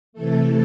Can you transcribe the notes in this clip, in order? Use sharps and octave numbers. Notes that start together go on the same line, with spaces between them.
C3 E3 A3 A4